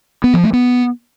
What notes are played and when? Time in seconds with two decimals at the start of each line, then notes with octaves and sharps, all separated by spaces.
0.24 B3
0.34 F3
0.43 A3
0.53 B3